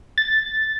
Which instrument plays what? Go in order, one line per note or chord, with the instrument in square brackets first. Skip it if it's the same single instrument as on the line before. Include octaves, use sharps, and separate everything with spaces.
[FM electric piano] A6